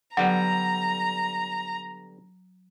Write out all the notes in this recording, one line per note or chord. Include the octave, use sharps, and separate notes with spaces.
D3 F#3 G3 B3 F#5 A#5